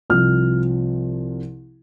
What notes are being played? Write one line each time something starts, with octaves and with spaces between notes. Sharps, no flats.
C2 C3 F3 F6